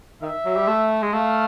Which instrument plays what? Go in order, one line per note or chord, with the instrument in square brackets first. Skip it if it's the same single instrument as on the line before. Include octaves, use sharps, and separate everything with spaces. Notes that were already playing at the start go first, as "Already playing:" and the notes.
[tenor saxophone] D#3 [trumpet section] E5
[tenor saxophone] F#3
G3
A3
G#3
[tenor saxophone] A3 [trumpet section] F5